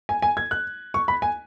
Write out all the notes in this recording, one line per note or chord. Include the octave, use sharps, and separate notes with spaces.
G#5
G#5
G#6
F#6
C#6
B5
G#5